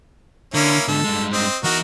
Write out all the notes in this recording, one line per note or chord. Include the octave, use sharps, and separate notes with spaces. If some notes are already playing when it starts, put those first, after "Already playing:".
D3 A#3 C#4 E4
G#2 D3 A4
G2 G#3
C4 D#5
E3 D#4 F#4 A#4 F#5